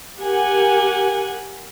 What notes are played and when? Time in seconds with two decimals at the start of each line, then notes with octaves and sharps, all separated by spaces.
0.20 G4 A#4 F#5 G#5